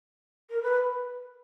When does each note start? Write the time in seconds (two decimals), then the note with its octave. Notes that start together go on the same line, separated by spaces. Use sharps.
0.49 A#4
0.62 B4